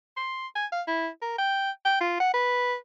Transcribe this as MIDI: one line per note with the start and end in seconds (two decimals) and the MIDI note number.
0.17 0.47 84
0.55 0.66 80
0.72 0.82 77
0.87 1.08 64
1.22 1.35 70
1.38 1.70 79
1.85 2.00 79
2.00 2.19 65
2.20 2.33 78
2.34 2.75 71